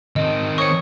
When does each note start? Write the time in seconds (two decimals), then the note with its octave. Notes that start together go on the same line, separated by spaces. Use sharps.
0.16 D#3 C4 D#5
0.58 C5 C#5 D#5 C#6 C#7